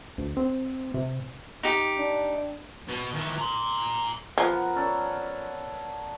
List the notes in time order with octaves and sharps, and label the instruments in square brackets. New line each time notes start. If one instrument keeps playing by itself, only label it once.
[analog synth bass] D2
C4
C3
[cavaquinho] D#4 G4
[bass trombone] D4
[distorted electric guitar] B2
D#3 E3
A#5 C6
[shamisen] F3 [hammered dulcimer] B3 A#4 F#5
[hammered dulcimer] C#4 A4 D5